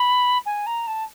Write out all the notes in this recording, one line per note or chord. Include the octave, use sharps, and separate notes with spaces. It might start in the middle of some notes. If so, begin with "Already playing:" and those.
Already playing: B5
G#5
A#5
A5